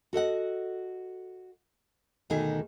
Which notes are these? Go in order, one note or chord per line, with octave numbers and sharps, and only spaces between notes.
F#4 A4 D#5 F#5
D2 B2 D#3 A3 D#4 G#4